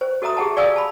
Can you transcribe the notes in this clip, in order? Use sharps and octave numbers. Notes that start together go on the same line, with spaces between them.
C5
F#4 A4 D#5 E5 A#5 D#6
G4 G#4 F#5 A5
D5 F5 G#5 D#6 E6
A5 B5